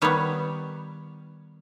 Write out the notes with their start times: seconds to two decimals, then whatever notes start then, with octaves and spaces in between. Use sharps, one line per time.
0.02 D#3 G3 B3 C#5